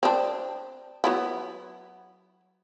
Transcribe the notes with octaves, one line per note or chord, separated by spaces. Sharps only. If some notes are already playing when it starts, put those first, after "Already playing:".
C4 D4
F#3 B3 E4